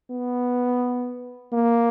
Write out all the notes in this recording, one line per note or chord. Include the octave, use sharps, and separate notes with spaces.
B3
A#3